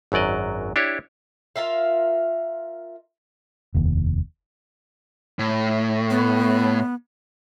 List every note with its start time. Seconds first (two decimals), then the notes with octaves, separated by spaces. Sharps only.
0.12 G#1 F#2 F#3 D5 D#5
0.76 D4 E4 G4 C#5
1.56 F4 A#4 E5 F5
3.74 F1 D#2
5.39 A2
6.10 B3